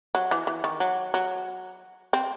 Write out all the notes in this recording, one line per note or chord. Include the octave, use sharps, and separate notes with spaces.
F#3
E3
E3
D#3
F#3
F#3
C4